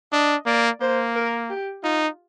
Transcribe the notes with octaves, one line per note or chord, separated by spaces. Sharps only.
D4 D#5
A#3 D5
A#3 C5
A#4
G4
D#4 F4